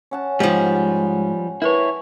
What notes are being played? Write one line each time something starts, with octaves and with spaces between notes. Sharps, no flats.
C#4 F#5 A5
G#2 F3 G3 G4
E4 A#4 B4 C#5